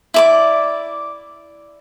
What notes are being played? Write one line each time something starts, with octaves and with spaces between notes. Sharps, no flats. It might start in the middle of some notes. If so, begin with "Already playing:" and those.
E4 D5 D6